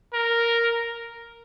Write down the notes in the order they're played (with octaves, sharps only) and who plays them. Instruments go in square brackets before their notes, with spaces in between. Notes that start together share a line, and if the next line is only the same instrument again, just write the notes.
[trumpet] A#4